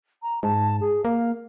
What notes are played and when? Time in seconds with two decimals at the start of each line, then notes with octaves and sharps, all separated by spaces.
0.23 A#5
0.43 G#2 A5
0.80 G#4
1.05 A#3 F5